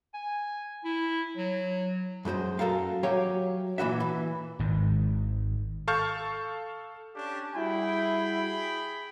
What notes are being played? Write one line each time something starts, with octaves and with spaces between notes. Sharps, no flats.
G#5
E4
F#3
F#2 G#3 A#4 C5
F#2 A4 A#4 F5
F#3 G4 C#5 E5 F5
A#2 E3 F#4 E5
E3
G#1 G#2 D#3
A4 F5 A5 C#6 F6 G6
C#4 D4 G4
G3 E4 F#4 G#4 G5 B5